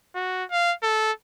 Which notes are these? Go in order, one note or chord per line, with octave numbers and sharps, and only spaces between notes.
F#4
F5
A4